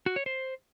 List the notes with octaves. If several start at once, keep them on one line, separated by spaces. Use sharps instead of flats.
F#4
C#5
C5